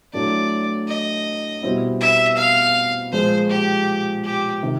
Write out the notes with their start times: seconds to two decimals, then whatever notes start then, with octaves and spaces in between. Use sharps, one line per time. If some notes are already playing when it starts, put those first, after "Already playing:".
0.13 A2 F#3 A3 D4 D5
0.88 D#5
1.62 B2 G3 C4 E4
2.01 E5
2.37 F5
3.12 A#2 F3 G#3 C5
3.50 G4
4.24 G4
4.63 C3 D#3